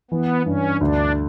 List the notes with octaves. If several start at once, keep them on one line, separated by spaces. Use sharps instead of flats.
E3 B3
G2 C#4
D2 D4